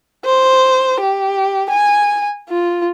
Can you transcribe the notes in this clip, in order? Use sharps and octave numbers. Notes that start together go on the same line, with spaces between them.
C5
G4
G#5
F4